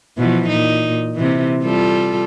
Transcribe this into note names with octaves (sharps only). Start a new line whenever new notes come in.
B2 E3 F3
A#2 D#4
C3 E3
G3 F4 A4